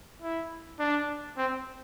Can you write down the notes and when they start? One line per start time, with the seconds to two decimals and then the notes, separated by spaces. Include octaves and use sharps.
0.22 E4
0.80 D4
1.38 C4